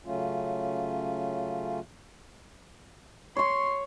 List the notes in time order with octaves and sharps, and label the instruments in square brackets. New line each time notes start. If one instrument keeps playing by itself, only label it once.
[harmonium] C#3 F#3 A3 C#4 F4
[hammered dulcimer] C#5 C#6 [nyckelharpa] C6